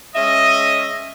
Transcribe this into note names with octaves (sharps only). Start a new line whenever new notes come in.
G#3 C#4 D#5 E5